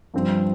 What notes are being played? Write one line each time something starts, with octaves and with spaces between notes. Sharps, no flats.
G2 F3 C4